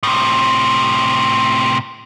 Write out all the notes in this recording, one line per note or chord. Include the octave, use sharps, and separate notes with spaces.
A2 C3